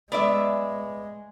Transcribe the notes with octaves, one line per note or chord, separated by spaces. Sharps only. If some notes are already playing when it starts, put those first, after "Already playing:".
G#3 B3 D5 E5